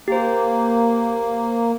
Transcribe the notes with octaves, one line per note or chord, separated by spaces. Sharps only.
A#3 G4 C5